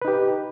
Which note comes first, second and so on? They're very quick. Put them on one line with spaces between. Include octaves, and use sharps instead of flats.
B4 D#4 G4